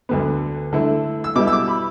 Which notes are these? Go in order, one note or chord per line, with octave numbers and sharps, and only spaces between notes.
D2 D3 B3
D3 A3 E4
E6
B2 G3 E4 D6
E6
D6
B5